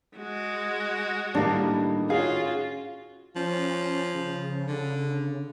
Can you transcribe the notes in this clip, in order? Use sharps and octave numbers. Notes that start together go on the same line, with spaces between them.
G#3 F#4
A2 D#3 G3 A#3 D4
C#4 F4 F#4 G#4 F5
F3 C#4
C#3
D3